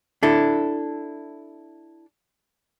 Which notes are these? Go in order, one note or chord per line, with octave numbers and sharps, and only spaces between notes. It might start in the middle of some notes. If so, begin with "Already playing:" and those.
D4 E4 A4